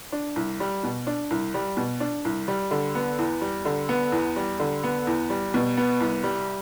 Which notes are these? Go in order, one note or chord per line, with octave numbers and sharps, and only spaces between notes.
D4
C2
G3
B2
D4
C2
G3
B2
D4
C2
G3
D3
B3
E2
G3
D3
B3
E2
G3
D3
B3
E2
G3
B2
B3
C2
G3